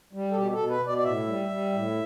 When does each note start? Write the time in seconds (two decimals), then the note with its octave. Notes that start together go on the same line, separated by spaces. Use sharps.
0.13 G3
0.31 A4
0.35 B2 G4
0.53 A4
0.58 B2
0.69 B4
0.81 B2
0.87 D5
0.98 D5
1.04 A2 E5
1.26 G3
1.49 G3
1.72 A2